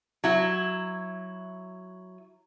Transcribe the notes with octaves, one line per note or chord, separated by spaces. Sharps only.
F#3 E4